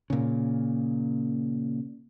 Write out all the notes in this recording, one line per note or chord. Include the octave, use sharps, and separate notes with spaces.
A#2 C#3